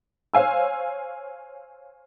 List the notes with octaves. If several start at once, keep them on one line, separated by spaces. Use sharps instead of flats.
C5 C#5 F5 G#5 E6